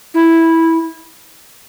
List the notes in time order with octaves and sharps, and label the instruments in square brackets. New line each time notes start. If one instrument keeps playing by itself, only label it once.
[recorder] E4